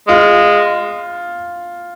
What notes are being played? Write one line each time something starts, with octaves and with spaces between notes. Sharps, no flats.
G#3 F4